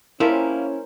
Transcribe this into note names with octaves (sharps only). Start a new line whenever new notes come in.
F3 G3 A#3 C#4 E4 A#4 C5